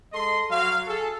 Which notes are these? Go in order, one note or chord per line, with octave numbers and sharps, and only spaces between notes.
G#3 A4 D#5 C6
F#3 F5
G#4 A4